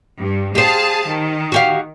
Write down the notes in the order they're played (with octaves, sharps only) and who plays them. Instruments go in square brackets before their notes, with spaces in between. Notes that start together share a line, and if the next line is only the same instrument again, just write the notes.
[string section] G2
[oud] G4 C5 [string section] G#4 F5 A5
[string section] D#3
[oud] F#4 G4 F5